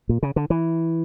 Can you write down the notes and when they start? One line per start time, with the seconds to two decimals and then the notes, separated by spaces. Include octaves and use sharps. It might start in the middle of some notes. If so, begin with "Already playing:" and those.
0.09 A#2
0.23 C#3
0.36 D3
0.50 E3